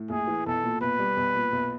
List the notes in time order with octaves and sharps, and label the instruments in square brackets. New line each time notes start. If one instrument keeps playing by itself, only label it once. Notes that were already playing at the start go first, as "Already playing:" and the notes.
Already playing: [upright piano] A2
[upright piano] A#1 [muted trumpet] G#4
[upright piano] E3
[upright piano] B1 [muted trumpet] A4
[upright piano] A#2
[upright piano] B1 [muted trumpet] B4
[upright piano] G3
B1
A#2
B1